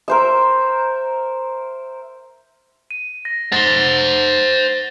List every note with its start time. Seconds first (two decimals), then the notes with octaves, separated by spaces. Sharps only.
0.08 A#4 C5 E5
2.91 D#7
3.25 A#6
3.52 C5 F#5 A6 A#6 G7